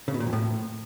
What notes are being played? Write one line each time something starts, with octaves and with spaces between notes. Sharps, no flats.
C#3
B2
A#2
F2
A2